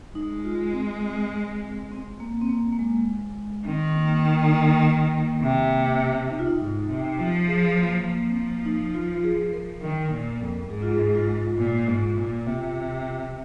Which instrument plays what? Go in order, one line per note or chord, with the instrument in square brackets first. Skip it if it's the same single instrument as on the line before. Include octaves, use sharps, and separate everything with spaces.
[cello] G#3 [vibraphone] D#4
[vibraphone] F4
C4
C4
A#3
C4
A#3
A#3
G#3
[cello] D#3 [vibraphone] C4
[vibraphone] A#3
A#3
[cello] C3
[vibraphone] D#4
F4
D#4
[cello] G#2
C3
[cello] F3 [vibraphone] F4
[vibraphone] G#4
A#3
[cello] F3 [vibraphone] A#3
[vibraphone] C4
A#3
D#4
F4
F4
G#4
A#4
[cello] D#3 [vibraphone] A#4
[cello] A#2
F2
[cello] G#2 [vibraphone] G#4
[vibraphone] F4
G#4
F4
[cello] A#2
G#2
A#2
C3